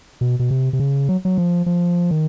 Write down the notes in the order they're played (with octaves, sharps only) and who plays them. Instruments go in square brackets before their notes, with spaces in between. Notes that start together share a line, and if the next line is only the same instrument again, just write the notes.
[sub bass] B2
B2
C3
C3
C#3
F#3
F#3
F3
F3
D#3